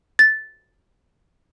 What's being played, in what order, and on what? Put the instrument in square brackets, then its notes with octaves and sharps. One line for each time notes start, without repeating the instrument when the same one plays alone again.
[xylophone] A6